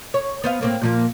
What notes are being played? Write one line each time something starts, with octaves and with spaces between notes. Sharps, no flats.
C#5
B3 C5 F5
A2 A#3 C4
A#2 F3 A#3